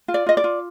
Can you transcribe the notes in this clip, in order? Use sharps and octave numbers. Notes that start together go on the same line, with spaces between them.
F4
D5
F4 D#5
D5
F4